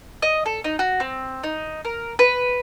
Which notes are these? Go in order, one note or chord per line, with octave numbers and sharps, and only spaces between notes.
D#5
A4
D#4
F#4
C4
D#4
A#4
B4